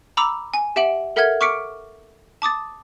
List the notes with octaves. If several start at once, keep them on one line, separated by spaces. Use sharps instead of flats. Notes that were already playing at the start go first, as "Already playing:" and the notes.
A#5 B5 D6 E6 F7
G#5
G4 E5 F#5 D7 F#7
A4 A#4 E5 F#5 F6 G#6
C#6 D6 F6 B6 C#7 D7
A5 D6 D#6 A6